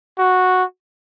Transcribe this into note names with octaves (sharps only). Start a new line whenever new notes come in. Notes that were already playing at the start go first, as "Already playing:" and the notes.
F#4